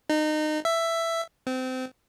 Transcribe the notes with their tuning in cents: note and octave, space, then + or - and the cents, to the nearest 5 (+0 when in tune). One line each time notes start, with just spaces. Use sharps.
D#4 -25
E5 +10
C4 -25